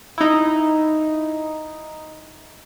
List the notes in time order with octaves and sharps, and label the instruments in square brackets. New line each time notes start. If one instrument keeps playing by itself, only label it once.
[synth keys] D#4 E4